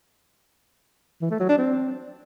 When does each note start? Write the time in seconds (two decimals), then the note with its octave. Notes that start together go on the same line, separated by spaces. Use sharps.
1.22 E3
1.31 A3
1.40 F#3
1.49 D4
1.58 C4